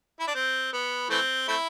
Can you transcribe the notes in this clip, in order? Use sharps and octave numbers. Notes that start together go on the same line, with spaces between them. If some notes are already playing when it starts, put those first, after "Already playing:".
E4
D4
C4
B3
E3 A3 C4
A3 C4 E4